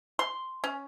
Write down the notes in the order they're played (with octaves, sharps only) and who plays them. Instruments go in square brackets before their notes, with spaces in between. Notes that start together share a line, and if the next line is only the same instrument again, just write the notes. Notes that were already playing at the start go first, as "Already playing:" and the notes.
[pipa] C6
C#4